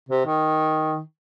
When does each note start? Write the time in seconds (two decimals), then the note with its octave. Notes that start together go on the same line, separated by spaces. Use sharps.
0.09 C3
0.25 D#3